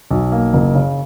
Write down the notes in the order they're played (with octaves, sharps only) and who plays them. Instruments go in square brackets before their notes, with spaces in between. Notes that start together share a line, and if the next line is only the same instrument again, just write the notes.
[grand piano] B1
A#3
F#1
C#3